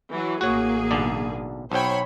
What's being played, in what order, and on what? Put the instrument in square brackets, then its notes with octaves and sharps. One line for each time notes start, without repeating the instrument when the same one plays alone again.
[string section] E3 F#3
[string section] A1 A#3 G#4 [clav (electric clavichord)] F#4 C#5
[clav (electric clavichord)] B1 D3 D5
[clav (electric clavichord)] B1 G5 [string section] C5 C#5 B5